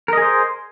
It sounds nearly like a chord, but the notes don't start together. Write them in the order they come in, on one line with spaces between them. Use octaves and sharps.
A#4 D#5 G#4 C5